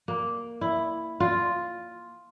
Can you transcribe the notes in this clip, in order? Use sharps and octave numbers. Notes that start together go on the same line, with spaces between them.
A#3
E4
F4